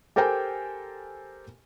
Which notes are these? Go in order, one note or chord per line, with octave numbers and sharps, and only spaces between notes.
G4 A4 A#4 C5 G5 G#5